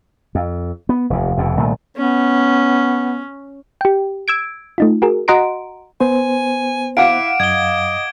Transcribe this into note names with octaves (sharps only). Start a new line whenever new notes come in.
F2
B3
F1 D#2
F1 F2 B2
C2 A#2 D#3 A3
B3 C#4
G4 G5
E6 G#6 D7
A3 D#4 F4
F#4 G#4 A#4
F#4 D#5 F#5 A#5 C6 D7
B3 C5 G#5
E4 F5 F#5 D6 D7
F#2 D#5 G#6 G7